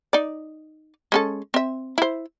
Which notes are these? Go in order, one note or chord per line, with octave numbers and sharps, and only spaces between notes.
D#4 D5
G#3 C#4 A4
C4 E5
E4 C5